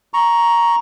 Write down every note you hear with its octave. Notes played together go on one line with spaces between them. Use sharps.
A#5 C#6